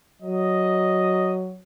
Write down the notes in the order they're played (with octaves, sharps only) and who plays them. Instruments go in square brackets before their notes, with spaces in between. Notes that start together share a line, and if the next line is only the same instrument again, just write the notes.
[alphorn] F#3 [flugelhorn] D#5